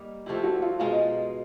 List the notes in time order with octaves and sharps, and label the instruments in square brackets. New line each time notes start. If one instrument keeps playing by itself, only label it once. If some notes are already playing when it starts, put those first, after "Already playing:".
Already playing: [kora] G3 A#3 D#4
[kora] F3 A3 C4 E4 [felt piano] G4
[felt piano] F#4
F4
[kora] B2 G#3 B3 D#4 [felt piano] F4